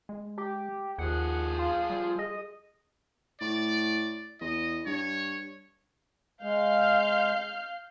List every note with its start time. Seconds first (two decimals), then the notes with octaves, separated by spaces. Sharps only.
0.09 G#3
0.38 G4
0.98 D#2 F3 G#4 F#5
1.58 F4
1.90 G3
2.18 G#4 D#5
3.41 A2 D5
4.41 E2 D#5
4.86 G2 C#5
6.42 G#3 F5 F6 G6